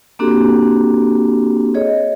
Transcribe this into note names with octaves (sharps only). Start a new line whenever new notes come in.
A#3 C4 D4 F#4 G4 A4
G#4 C#5 D#5